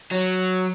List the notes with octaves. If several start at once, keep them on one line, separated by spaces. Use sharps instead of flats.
F#3